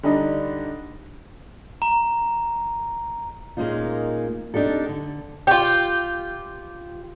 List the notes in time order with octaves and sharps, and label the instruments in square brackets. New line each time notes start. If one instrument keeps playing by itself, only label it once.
[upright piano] D3 G3 D4 D#4
[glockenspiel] A#5
[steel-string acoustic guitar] A#2 G#3 A#3 C#4 D#4 F4
C4 D4 D#4 G4 A4
D3
[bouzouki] F4 G4